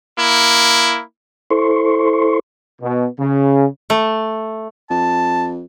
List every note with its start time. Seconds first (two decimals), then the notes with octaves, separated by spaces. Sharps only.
0.18 A#3 E4
1.51 E4 A4 C5 C6 C#6
2.82 B2
3.19 C#3
3.90 A3
4.90 F2 A5